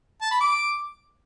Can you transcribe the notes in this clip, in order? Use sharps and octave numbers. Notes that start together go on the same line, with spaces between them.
A5
B5
D6